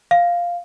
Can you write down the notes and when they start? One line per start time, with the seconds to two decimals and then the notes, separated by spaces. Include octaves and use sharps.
0.11 F5